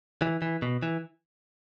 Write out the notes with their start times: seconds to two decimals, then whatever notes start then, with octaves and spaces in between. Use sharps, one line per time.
0.22 E3
0.42 E3
0.62 B2
0.83 E3